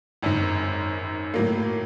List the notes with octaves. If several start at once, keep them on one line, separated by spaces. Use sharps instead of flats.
G#1 F#2 D#3
A2 F#3 A#3